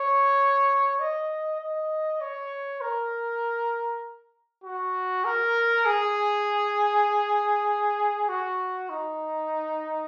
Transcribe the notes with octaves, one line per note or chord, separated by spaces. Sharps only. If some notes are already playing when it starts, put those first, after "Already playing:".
Already playing: C#5
D#5
D#5
C#5
A#4
F#4
A#4
G#4
F#4
D#4